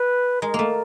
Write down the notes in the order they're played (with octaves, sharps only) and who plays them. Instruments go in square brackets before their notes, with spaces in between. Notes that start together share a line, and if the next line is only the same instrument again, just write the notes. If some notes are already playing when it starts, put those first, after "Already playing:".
Already playing: [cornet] B4
[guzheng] G#3 [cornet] A#4
[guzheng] A3 A#3